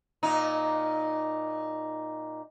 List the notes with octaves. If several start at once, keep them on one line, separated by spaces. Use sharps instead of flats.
A#2 D#4